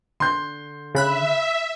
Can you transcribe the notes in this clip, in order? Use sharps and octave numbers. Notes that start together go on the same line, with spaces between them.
D3 C6 G6
C#3 E5 B5 F#6